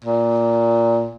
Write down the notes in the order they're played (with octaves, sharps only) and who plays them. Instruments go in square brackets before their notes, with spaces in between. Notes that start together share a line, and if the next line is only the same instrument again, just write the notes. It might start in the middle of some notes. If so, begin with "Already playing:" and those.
[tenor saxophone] A#2